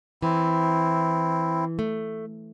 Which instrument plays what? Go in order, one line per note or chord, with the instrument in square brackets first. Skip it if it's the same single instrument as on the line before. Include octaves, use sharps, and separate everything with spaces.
[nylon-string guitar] E3 [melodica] C4 E4
[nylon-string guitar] A3